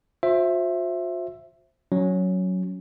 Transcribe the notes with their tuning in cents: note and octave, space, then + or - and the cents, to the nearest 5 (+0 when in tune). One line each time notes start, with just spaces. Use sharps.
F4 +45 C5 +15 E5 +10
F#3 +0 C#4 +5